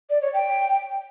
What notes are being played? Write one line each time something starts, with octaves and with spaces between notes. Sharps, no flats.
D5
C#5
G5